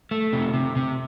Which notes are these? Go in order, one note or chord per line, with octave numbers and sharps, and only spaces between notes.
A3
C3
C3
C3